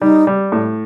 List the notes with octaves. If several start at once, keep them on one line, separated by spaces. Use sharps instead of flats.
G3 D#4
G3
A2